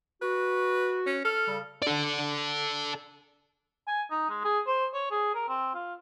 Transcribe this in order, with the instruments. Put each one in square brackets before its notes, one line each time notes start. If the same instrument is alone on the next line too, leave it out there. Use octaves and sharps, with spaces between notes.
[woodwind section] F#4 [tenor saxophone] B4
[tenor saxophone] C#4
[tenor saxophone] A4 [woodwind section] F6
[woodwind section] C#3 G3
[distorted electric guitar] A4 D5
[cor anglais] G#5
D#4
G#3
G#4
C5
C#5
G#4
A#4
C4
F4